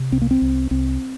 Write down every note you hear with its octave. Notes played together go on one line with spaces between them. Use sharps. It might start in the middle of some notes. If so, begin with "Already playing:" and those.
Already playing: C3
C2 C4
A#3
C4
C2
C2 C4